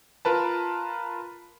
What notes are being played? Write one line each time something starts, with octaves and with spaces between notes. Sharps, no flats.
F4 A#4 B4 A5